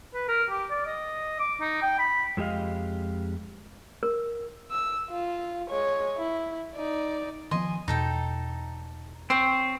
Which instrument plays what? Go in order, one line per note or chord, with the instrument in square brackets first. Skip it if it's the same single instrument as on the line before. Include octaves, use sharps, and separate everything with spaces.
[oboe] B4
A#4
G4
D5
D#5
D6
D#4
G5
B5
[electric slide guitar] F2 G#3 G4 D#5 F5
[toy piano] A#4
[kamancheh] E6
F4
G#3 C#5
E4
D#4 D5
[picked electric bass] D#3 F3 B3 [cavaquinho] D#5 G#5 C6
[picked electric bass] E2 B2 [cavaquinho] D#4 A4 G5
[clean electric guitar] C4 [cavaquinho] C5 C#5 G5